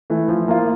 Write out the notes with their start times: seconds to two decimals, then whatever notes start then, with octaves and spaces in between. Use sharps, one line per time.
0.10 E3 A3
0.28 F3
0.48 A#3 F4